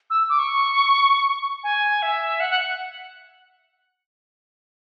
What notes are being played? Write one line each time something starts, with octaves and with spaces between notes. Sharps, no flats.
E6
D6
C#6
G#5
E5
F#5
F#5